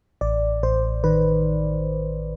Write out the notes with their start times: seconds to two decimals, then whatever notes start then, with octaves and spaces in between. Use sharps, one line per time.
0.21 A1 D5
0.63 A1 C5
1.04 D#3 B4